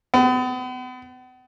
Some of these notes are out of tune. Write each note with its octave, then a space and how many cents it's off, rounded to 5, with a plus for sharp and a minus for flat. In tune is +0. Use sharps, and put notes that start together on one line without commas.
B3 +40